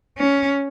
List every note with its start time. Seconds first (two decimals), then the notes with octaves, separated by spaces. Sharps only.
0.18 C#4